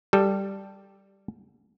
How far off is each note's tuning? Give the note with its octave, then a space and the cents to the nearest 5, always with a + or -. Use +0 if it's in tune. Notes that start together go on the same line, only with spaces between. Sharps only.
G3 +0 A4 +0